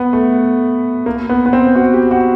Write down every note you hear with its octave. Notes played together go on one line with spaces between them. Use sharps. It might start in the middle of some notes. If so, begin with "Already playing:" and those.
Already playing: B3
A3
A#3
B3
B3
C4
F#4
G4
F#4